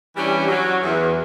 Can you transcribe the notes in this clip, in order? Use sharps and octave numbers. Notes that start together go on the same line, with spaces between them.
E3 G3 C#4 D4 G4
F#3
E2